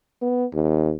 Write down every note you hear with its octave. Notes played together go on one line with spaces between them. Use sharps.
B3
D#2